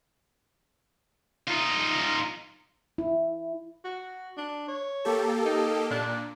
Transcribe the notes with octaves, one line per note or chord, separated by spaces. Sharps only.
D#4 F4
E4
F#4
D4
C#5
A#3 G4 A4
D#4
A#2 D4